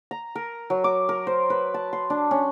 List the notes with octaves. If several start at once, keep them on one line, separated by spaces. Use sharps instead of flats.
A#5
A#4
F#3
D6
A#4
C5
B4
A5
C6
D4
C#4